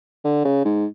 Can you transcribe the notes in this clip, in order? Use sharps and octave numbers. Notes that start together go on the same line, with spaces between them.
D3
C#3
G#2